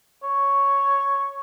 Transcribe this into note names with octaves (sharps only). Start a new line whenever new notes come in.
C#5